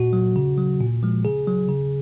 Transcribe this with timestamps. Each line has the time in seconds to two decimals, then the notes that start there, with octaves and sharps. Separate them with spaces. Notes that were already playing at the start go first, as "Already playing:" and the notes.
Already playing: A#2 F#4
0.13 F#3
0.36 C#3
0.58 F#3
0.81 A#2
1.03 F3 G#3
1.25 C#3 G#4
1.47 F#3
1.69 C#3